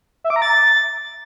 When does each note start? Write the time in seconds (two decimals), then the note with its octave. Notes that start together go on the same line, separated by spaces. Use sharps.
0.24 E5
0.30 D6
0.36 A#5
0.42 A6